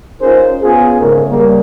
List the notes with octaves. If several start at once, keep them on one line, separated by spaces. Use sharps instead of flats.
C#4 D#4 F4 G#4 A#4 C5
B3 C#4 F4 G#4
G#1 G#2 C#3 A3 A#4
C#3 G3 A#3